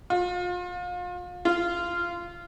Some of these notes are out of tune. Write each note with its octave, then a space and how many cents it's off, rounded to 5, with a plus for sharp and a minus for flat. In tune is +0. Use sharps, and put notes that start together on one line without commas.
F4 +35
F4 -15